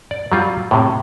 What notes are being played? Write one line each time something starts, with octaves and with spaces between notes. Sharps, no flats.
D5
F#3 G3 F4
A2 C3